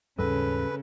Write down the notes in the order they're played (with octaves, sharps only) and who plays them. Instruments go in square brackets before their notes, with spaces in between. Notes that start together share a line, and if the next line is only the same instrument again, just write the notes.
[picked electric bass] D#2 G#2 G3 [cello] C#3 [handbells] A4 [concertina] B4